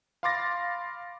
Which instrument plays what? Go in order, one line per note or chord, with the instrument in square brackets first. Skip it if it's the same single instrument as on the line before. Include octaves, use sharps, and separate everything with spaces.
[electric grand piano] F5 B5 C6 D6 A6 A#6